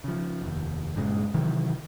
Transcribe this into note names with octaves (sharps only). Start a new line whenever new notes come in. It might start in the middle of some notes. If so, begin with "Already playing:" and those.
C#3 F3
F1 D#2
G2 A#2 C#3 G#3
C3 D#3 E3 F#3